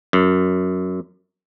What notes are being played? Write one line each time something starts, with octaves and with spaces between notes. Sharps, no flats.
F#2